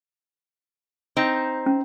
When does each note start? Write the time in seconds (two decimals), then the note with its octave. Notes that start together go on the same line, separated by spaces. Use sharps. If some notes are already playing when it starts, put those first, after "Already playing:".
1.17 C4 D#4
1.66 C#4